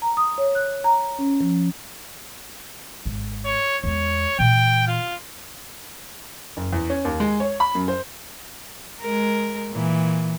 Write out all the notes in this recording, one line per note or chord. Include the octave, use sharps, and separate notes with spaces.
A#5
D#6
C#5
F#6
A#5
C#4
F3
G#1
C#5
E2 G#3 C#5
A#2 E3 G5
F4
F#1
E2
C#4
D#2
G#3
C#5
B5
F#2
C5
G#3 A#4
A#2 E3